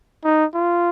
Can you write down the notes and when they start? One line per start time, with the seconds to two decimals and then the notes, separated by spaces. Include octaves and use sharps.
0.24 D#4
0.53 F4